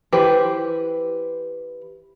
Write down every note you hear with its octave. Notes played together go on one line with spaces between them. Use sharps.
E3 G4 B4 C5